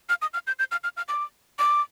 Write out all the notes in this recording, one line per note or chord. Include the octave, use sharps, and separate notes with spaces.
F6
D#6
F6
G6
G6
F6
F6
F6
D6
D6